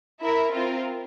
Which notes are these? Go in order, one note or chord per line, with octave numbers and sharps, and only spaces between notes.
E4 A#4 E5
C4 F4 A#4